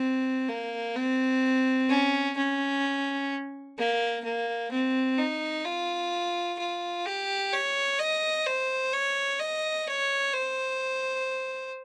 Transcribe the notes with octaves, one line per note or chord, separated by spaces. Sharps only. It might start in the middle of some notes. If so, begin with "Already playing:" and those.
Already playing: C4
A#3
C4
C#4
C#4
A#3
A#3
C4
D#4
F4
F4
G4
C#5
D#5
C5
C#5
D#5
C#5
C5